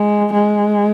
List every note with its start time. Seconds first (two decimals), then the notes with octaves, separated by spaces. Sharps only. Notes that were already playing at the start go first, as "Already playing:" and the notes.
Already playing: G#3
0.33 G#3